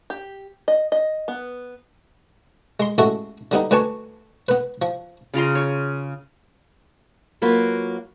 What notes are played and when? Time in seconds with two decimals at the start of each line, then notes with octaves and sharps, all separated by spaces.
0.10 G4
0.68 D#5
0.92 D#5
1.28 B3
2.80 G#3 C6
2.98 A1 G#3 F#4 A4 E5
3.51 D3 G3 B3 D#4
3.71 D2 B4 D5 G#5 A5 C#6
4.49 B3 B4
4.82 F3
5.34 C#3 F4 A#5 C6
5.55 C#5
7.42 F#3 A#3 F4 F#4 B4